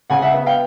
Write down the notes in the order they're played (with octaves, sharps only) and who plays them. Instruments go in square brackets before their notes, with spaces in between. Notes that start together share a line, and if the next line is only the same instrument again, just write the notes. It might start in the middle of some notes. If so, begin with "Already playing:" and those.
[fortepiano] C#3 F#5 G#5
E5 F#5
B3
F5 G5